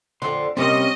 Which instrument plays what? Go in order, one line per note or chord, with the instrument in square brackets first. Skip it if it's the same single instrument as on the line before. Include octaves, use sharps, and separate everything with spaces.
[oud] F2 D3 D5 [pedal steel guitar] C6
[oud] C3 G3 A#3 [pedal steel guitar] C4 C#4 G4 [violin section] D#5